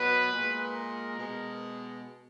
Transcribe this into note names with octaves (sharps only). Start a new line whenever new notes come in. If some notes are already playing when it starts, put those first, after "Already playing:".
Already playing: B2 F#3 B4
A#2 G#3
A#4
B2 G#3